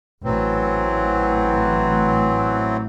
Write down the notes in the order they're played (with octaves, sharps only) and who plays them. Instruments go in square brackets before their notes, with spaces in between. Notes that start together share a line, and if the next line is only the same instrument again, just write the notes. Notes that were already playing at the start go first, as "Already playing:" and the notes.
[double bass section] A1 [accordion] E3 F#3 C4